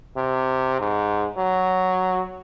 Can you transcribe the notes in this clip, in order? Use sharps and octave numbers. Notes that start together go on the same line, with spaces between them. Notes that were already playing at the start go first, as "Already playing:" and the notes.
C3
G#2
F#3